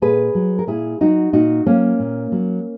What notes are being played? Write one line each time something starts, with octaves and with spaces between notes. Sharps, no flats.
A#2 G#4 B4
F#3
A#4
A#2 E4 G#4
F#3 D#4 F#4
A#2 D#4 F#4
F#3 A#3 C#4
A#2
F#3